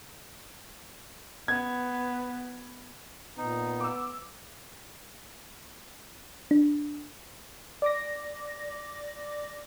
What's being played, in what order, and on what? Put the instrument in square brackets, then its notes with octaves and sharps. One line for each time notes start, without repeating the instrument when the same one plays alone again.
[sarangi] B3 [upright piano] G#6
[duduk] A#2 [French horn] B3 [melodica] D#4
[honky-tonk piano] D6 E6
[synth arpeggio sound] D4
[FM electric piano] D5 D6 A#6